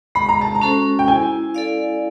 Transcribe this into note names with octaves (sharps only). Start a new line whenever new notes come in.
G#3 B5
A#5
A5
A#5
C#4 F#4 A4 C5
G5
E4 G#5
A4 D5 F5